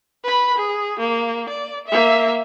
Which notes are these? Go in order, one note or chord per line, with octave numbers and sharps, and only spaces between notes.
B4 B5
G#4
A#3
D5
A#3 E5